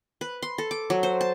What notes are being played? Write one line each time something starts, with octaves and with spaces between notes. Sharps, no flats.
B4
C6
A4
D6
F#3
C5
A5